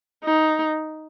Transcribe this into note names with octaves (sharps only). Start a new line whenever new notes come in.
D#4